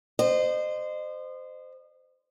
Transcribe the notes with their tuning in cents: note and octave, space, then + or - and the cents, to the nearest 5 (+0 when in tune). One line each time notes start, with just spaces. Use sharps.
C5 -15 D#5 -35